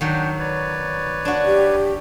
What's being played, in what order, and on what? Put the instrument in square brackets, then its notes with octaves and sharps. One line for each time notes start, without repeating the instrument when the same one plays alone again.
[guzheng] D#3 F#3 [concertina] D4 F#5 G5
[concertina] B4 C#5 D5
[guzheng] D4 F#4
[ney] G4